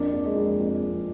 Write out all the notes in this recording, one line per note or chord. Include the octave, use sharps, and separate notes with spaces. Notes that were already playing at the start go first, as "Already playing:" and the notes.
Already playing: F2 A#3 D4
F2
G#3
F2
F2
F2